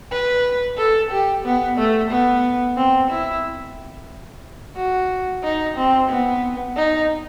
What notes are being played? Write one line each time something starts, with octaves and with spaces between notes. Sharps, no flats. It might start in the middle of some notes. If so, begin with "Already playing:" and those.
B4
A4
G4
B3
A3
B3
C4
E4
F#4
D#4
C4
B3
D#4